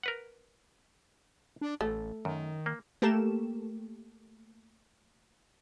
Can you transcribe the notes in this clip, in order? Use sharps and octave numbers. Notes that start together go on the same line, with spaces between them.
A#4 B4 F#5
D4
A1 A3
F#2 D#3
A#3
A3 A#3 G4 A4 A#4 E7